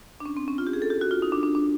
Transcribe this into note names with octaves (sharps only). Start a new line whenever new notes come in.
D4
C#4
C4
C#4
F4
G4
G#4
A4
G4
F#4
F4
D#4
D4
D4
D4